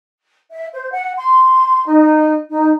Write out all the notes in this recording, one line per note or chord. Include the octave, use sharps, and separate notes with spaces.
E5
C5
F#5
C6
D#4
D#4